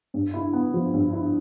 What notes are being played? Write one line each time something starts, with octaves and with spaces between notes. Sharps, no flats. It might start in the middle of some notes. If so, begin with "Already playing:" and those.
G2
E4
B3
F3
G2
E4